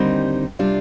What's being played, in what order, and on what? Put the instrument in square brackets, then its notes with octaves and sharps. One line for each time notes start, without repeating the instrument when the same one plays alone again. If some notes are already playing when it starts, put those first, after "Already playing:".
Already playing: [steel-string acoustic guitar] D#2 D3 G3 C4 D#4
C3 G3 D4 F4